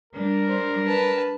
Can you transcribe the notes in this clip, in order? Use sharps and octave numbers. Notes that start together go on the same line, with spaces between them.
G3 D4 A#4
C5
B4 A5